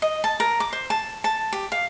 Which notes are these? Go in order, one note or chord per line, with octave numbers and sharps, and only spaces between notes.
D#5
A5
A#4
D6
C5
A5
A5
G4
F5